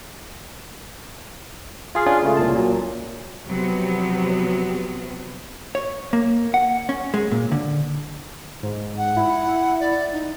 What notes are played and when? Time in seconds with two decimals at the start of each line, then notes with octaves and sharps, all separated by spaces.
1.95 F4 G#4 F5
2.06 C#4 D4 F4 G#4
2.23 C#3 G#3 A3 F4
2.37 C2 A#2 A5
2.55 A#2 F#3
3.47 C3 F3 F#3 B3
5.75 C#5
6.13 A#3
6.54 F#5
6.89 C#4
7.14 G#3
7.32 A#2
7.52 D3
8.63 G#2
8.97 F#5
9.17 E4
9.80 D5
10.13 D#4